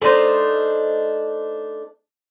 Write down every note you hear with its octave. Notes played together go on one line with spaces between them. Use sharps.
A3 D4 D#4 C5